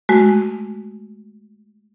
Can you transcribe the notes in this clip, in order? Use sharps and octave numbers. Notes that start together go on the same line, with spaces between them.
G#3 A3 F#4